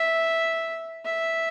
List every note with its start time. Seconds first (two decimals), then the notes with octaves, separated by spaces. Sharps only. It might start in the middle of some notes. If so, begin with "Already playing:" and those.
Already playing: E5
1.05 E5